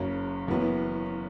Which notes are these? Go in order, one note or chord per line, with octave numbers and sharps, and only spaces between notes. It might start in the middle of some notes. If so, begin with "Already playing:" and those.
Already playing: F#1 F#2 C#3
F#1 F#2 E3 B3 E4